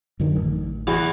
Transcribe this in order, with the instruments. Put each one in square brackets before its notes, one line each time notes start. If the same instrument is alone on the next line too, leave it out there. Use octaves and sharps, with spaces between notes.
[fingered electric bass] F#2 D3 D#3
A1
[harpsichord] E2 E3 F#4